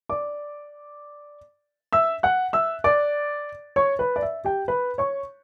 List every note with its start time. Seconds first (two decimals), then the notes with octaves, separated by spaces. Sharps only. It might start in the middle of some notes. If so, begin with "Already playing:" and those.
0.09 D5 D6
1.93 E5 E6
2.23 F#5 F#6
2.53 E5 E6
2.84 D5 D6
3.76 C#5 C#6
3.99 B4 B5
4.16 D5
4.22 E5
4.45 G4 G5
4.68 B4 B5
4.98 C#5 C#6